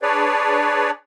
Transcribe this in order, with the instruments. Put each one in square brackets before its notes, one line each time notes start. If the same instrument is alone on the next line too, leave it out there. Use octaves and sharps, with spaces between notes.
[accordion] D4 G#4 B4 C#5 D5